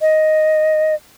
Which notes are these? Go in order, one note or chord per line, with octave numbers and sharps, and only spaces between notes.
D#5